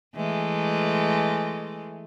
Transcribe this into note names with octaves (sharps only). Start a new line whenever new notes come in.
E3 G#3 A3